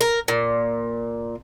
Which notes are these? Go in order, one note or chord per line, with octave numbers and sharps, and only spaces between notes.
A#4
A#2